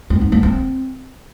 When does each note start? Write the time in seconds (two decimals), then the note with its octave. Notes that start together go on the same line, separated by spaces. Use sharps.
0.10 C4
0.21 D#4
0.32 A#3
0.43 C4